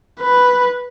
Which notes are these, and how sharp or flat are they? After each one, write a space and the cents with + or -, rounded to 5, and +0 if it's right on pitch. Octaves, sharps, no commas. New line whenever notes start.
B4 +0